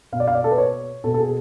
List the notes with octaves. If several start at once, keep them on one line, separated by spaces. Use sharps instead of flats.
B2 F5
D5
F5
D5
A4
B4
C#5
B2 A4
A4
G#4